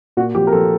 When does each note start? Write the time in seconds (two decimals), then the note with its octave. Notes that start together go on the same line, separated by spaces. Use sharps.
0.17 A#2 F#4
0.35 F3 G4
0.47 A#4
0.52 F3 A4